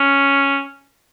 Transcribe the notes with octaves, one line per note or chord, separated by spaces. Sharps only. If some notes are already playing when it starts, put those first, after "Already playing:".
Already playing: C#4